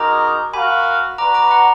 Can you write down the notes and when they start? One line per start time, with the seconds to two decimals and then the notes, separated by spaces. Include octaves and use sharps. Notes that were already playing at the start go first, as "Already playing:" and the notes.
Already playing: G#3 D#4 F#4 A#4 A#5 D6
0.53 F#4 A#4 F5 G#5 B5
1.18 D4 F#4 B4 A#5 D6
1.34 A#5 D6
1.51 F#5 A#5